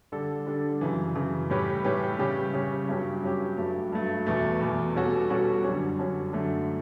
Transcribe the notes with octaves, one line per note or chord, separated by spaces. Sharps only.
D3 G3 D4 A4
D3 G3 D4 A4
F#2 C#3 E3
F#2 C#3 E3
A2 G3 C#4 G4 B4
A2 G3 C#4 G4 B4
C#3 G3 C#4 G4
C#3 G3 C#4 G4
G2 F#3 C#4 G4
G2 F#3 C#4 G4
G2 F#3 A3
G2 F#3 A3
E2 B2 A3
E2 B2 A3
B2 G3 C#4 F#4 A4
B2 G3 C#4 F#4 A4
F#2 D3 G3 C#4
F#2 D3 G3 C#4
F#2 D3 A3